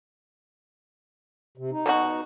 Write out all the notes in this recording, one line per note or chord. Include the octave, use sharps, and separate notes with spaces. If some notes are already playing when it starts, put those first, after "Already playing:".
C3
D#4
B2 E4 F#4